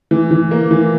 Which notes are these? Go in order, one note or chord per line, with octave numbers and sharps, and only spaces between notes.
E3
E3
A#3
E3